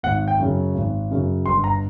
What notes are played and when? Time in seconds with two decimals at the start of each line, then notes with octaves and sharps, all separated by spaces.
0.03 G#1 F#5
0.28 G5
0.39 F#2 C#3
0.74 G#1
1.11 F#2 C#3
1.45 G1 C6
1.64 A#5